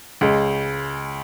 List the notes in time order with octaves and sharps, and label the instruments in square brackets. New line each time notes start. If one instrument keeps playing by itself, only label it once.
[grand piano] C#2 [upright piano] G#3